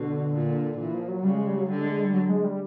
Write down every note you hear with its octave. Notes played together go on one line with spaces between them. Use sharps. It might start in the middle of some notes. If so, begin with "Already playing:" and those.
Already playing: B2 D3
A#2
A#2 E3
F3
F#3
C#3 G3
G#3
G3
F#3
D3 G3
G#3
G#3
G3
F#3
G#3
G3